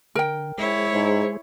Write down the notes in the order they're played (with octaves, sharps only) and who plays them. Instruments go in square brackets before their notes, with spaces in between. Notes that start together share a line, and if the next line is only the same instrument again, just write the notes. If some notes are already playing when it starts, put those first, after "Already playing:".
[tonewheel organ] D3 [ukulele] A#4 G5
[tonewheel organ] G#3 G#4 C5 [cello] E4 C#5
[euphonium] G#2